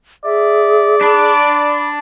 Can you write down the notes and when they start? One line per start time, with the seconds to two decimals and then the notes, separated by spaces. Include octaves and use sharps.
0.25 G#4 D5 E5
1.01 D4 B5